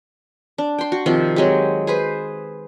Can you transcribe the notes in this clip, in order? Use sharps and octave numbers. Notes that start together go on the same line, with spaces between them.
D4
G5 C6
F#4
C3 D#3 F3 C4
F#3 G#3 C4 G4
G#4 B4 C5